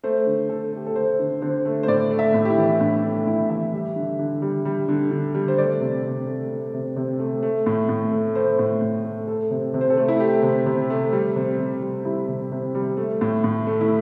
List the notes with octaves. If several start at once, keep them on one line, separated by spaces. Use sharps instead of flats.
A3 C5
D3
D3 A4
A3 G4
A4
A3 C5
D3
D3 C5
A3
C5
A2 D5
A3
E5
A2
G4
E4
E3
A2 D4
A3 D4
A2 E4
E3 E5
G3
D3
D3
G3
G3
D3
D3
G3
C5
A3 D5
C3
C3
A3
A3
C3
C3
A3
A3
A2
A2
A3
A3 C5
A2
A2
A3
A3 A4
C3
C3
C5
A4
A3
E4
A3 G4
C3
C3
A3
G3
C3
C3
G3
G3 E4
C3
C3
G3
A3
A2
A2
A3
E4